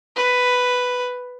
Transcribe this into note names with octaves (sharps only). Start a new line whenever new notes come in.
B4